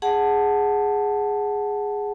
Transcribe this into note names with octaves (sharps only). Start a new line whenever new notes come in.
G#4 F#5 A5